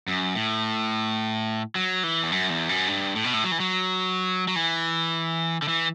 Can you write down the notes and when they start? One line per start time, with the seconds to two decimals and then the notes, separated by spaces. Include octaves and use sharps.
0.08 F#2
0.35 A2
1.75 F#3
2.04 E3
2.23 E2
2.32 F#2
2.50 E2
2.69 F#2
2.87 G2
3.15 A2
3.24 B2
3.34 A2
3.44 F#3
3.51 E3
3.60 F#3
4.48 F#3
4.56 E3
5.62 D3
5.68 E3